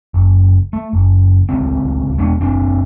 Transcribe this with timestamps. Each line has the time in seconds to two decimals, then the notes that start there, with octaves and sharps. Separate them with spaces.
0.14 F#1
0.73 A3
0.93 F#1
1.49 D1 C#2 C4
2.18 E1 G#3 B3 D4
2.40 F#1 C4 D4